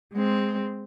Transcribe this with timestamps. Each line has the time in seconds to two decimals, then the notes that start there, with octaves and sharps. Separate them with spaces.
0.13 G#3 C4